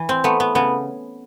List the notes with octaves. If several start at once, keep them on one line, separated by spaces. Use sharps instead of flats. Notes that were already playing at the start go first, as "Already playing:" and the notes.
Already playing: E3
C4
A3 B3
B3
C#3 B3